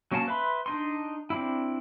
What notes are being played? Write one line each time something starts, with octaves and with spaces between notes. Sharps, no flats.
F#3 A#3 C#4 F5 A5
B4 E5 B5 C6
D4 D#4 C6
C4 D4 E4